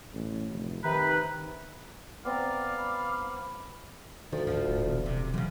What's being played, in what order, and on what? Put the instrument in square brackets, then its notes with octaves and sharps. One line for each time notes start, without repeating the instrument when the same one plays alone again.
[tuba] A1
F1
[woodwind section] C3 D#4 B4 [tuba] D#3
[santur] B3 C4 A#5 [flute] D5 [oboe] F5 [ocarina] D6
[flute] B5
[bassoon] D2 [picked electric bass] D#3 [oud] F3
[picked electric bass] D1 G#1 D3 [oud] F3
[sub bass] D#1 [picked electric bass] A2
[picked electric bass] A#1 B2 E3
[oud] C3
[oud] F#2 C#3 [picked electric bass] E3 F#3 G#3